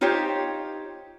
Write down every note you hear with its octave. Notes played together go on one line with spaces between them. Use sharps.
D#4 F4 G4 C5 C#5